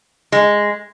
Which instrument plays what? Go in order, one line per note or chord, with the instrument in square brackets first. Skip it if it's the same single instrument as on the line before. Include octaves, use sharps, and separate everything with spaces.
[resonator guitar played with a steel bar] G#3